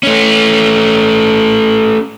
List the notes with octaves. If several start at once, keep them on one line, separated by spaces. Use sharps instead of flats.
A3 C#4